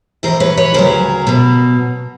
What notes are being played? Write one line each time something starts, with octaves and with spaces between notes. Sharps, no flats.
C#3 E3 A#4 C5
F2
B4 C#5
B4 C#5
D2 C#3 F#3 A#4 C5
B2 F#3